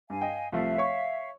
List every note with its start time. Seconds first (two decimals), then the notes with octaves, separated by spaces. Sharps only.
0.10 G2 F5 G#5
0.21 D#5 G5
0.52 C2 F3 A3 E5 F5
0.78 C#5 C#6